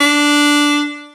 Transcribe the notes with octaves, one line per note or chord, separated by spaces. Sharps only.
D4